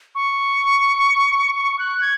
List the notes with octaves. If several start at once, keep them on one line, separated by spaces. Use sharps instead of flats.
C#6
C#6
F#6
G#6